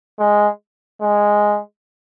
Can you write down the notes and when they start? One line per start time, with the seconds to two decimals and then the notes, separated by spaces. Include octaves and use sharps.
0.19 G#3
1.02 G#3